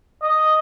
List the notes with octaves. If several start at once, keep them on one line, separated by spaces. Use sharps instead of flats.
D#5